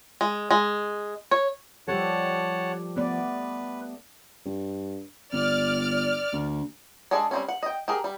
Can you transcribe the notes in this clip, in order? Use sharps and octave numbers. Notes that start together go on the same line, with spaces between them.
G#3
G#3
C#5
F3 G3 G4 A4 C#5 F#5 A5
A3 B3 B4 D5
G2
G1 D5 F6
D2
G#3 D4 G#4 A4 D5
G3 C4 C#4
F#5
D#5 G5
G4 G#4 A#4
G3